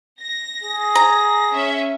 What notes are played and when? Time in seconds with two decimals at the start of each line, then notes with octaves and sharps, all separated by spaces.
0.20 A#6
0.63 G#4
0.95 A#5
1.53 C#4 E5